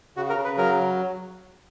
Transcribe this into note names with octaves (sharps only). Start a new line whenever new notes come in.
C#3 F#4
A#4
C#3
B4
F#3 A#4